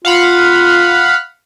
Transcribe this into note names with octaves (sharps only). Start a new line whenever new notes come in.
F4 F5 F#5 B5